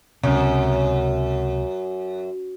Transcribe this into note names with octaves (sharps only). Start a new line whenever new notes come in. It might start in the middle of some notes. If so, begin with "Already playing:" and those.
C#2 F#2 C3